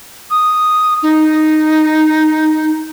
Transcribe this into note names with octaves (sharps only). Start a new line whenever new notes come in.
D#6
D#4